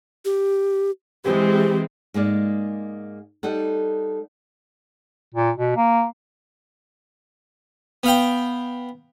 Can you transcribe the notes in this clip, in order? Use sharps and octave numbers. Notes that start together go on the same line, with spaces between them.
G4
E3 G#3 C4 G4
G#2 G#3 A#3 D5
G3 D#4 A4 F#5
A#2
B2
A#3
B3 F5 G5